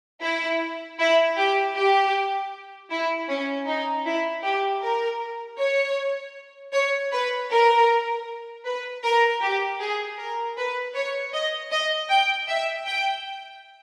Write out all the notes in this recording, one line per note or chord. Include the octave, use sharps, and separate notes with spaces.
E4
E4
G4
G4
E4
C#4
D#4
E4
G4
A#4
C#5
C#5
B4
A#4
B4
A#4
G4
G#4
A#4
B4
C#5
D#5
D#5
G5
E5
G5